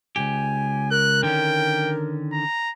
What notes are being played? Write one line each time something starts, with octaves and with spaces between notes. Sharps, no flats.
C#2 F#2 G4 G#5
A#4 F#6
D3 D#3 C#4 G5
A#5